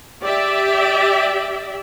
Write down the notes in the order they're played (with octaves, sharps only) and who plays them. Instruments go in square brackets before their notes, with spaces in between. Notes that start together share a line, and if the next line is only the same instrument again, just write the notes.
[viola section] G4 D5 E5